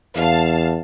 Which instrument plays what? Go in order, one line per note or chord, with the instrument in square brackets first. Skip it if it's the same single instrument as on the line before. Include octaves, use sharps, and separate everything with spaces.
[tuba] E2 [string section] F5 A5